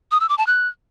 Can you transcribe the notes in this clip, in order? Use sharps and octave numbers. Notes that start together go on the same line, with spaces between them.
D#6
E6
D6
A5
F#6